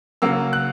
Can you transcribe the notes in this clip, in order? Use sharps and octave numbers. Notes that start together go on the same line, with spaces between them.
C#3 F#3 A#3 E6
F#6